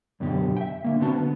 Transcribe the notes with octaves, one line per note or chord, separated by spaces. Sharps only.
F#2 B2 D3 G4
E5 G5
D3 A#3
D3 B3 C4 F#4 A5
D3 B3